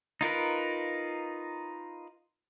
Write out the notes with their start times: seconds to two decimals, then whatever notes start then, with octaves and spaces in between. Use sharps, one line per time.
0.21 D#4 F4 A#4 B4